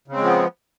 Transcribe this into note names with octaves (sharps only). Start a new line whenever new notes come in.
C#3 F3 G#3 B3 C4